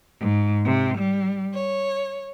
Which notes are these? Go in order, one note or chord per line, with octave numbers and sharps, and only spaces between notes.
G#2
C3
G3
C#5